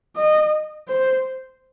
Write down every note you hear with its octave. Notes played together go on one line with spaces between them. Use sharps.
D#5
C5